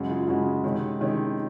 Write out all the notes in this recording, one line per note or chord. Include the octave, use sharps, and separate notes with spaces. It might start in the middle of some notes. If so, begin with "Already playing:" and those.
Already playing: F#2 C#3 G#3 F#4
F4 G#4
F#2 C#3 G#3 F#4
C3 D#3 G#3 C#4
C3 D#3 G#3 C#4